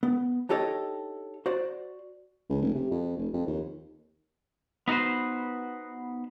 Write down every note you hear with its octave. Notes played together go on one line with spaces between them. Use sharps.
B3
D4 D#4 G4 A4 C#5 D#5
F#4 C5 D5
C#2
F1
C3
F2
F1
F2
D#2
B3 D#4 F#4 B4 C5